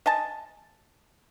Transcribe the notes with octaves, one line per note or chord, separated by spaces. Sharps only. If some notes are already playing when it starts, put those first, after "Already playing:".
D#5 G#5 A5